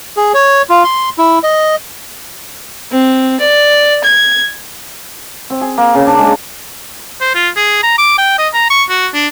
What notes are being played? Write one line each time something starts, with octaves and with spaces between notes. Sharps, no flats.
G#4
C#5
F4
C6
E4
D#5
C4
D5
G#6
C4
G#4
A#3
C#3
D4
G#3
C5
F4
G#4
A#5
D6
G5
D#5
A#5
C#6
F#4
D4